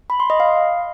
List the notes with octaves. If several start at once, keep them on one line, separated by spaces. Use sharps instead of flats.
B5
C6
D#5
F5